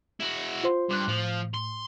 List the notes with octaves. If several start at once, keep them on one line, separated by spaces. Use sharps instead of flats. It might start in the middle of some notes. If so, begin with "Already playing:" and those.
E4 F#4
F4 C5 C6
G2 C6 D6 F#6
A2 F3
C6